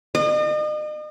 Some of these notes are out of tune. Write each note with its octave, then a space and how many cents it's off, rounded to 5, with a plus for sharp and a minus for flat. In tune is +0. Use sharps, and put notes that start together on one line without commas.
D#5 -40